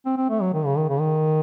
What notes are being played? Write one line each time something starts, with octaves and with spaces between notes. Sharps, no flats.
C4
C4
A3
F#3
D#3
C#3
D#3
C#3
D#3